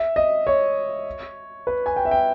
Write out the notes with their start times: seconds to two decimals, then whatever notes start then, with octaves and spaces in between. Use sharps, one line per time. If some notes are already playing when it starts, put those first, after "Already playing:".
Already playing: E5
0.16 D#5
0.47 C#5
1.67 B4
1.86 G#5
1.96 G5
2.05 E5
2.11 G5